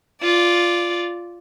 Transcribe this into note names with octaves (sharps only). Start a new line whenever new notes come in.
F4 D5